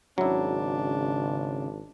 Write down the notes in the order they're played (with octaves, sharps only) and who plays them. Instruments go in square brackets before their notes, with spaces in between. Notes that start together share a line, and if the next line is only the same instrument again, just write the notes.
[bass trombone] G#1 [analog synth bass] C#3 [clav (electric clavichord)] F#3 E4 [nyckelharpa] D4